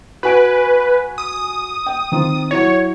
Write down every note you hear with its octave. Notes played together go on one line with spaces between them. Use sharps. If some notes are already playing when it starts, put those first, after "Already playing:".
F#4 B4 G#5 D7
D#6
G5
D#3 C4 F4
F#3 E4 C#5